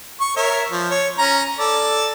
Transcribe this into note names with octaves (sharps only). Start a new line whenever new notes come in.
C#6
A#4 C#5 E5
F3
C#5
C#4 A#5
A4 D5